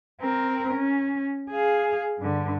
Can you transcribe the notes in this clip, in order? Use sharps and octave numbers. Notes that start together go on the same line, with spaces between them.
C4 A#4
C#4
G#4 F5
G2 D3